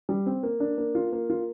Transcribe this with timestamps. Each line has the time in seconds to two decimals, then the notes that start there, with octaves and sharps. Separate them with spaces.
0.09 G3
0.26 C4
0.43 A#3
0.60 D4
0.78 A#3
0.95 F4
1.12 A#3
1.30 F4